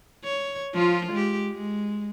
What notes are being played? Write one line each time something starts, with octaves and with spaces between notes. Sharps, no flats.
C#5
F3 F4
G#3 G4
G#3